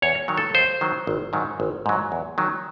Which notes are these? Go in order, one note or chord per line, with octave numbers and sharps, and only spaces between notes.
E2 C#5
D#3 F#3
A4
D#2 C5
D#3 F#3
G#1
G#2 D#3 F#3
G#1
G#2 F#3
E2
D#3 F#3